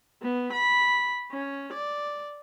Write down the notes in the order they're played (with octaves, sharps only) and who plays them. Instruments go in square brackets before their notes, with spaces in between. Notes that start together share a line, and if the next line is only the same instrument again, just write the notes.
[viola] B3
B5
C#4
D5